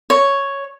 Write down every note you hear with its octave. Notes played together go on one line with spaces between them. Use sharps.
C#5